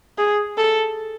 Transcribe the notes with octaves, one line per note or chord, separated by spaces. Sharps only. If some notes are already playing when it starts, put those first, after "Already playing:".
G#4
A4